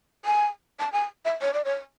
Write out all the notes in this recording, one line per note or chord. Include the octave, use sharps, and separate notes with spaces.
G#5
A5
G#5
E5
C#5
D5
C#5